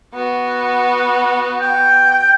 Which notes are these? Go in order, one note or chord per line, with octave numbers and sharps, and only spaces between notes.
B3 F#4
G5